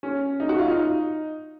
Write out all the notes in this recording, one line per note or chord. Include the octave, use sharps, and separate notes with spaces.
C#4
D#4
F#4
F4
D#4